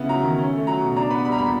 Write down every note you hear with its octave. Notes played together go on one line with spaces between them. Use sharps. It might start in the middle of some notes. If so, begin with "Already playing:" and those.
Already playing: C#3 B3 E4
F#3 A#5
D#3
C#4
A3
F#3 A#5
B2
D4 A#5
B3 B5
G3 B5
A#5
A#2 B5